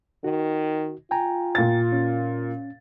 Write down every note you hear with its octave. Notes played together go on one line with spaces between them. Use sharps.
D#3 F#4
F4 G5 G#5 A#5
A#2 A6
C#4